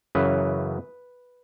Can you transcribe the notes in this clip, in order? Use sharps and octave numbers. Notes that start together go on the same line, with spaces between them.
F#2 C#3 E3 B4